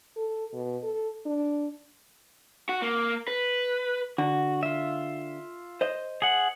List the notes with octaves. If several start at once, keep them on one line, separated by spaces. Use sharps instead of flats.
A4
B2
A4
D4
F#4
A#3
B4
D3 F#4
F4 E5
C5 D#5
G#4 F#5